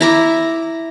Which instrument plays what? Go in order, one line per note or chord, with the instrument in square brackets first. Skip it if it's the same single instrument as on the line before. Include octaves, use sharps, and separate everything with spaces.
[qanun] E4 A#5 D6